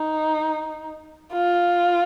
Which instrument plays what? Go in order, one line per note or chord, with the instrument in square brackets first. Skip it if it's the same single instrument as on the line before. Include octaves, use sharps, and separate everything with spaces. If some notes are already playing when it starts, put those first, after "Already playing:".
Already playing: [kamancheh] D#4
F4